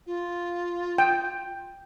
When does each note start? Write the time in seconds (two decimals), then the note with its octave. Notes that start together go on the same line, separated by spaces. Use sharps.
0.06 F4
0.98 G5